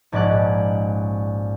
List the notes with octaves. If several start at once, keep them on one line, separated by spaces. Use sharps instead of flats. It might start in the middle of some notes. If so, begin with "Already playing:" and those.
A#1 G#2 C#4 D5 D6 F#6